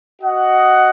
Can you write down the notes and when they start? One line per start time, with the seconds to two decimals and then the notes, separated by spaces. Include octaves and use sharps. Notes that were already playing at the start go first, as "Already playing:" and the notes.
0.22 F#4 D#5 F#5